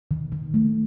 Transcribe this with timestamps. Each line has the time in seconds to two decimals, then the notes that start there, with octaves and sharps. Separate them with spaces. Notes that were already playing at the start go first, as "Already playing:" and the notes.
0.11 D#3
0.32 D#3
0.54 A3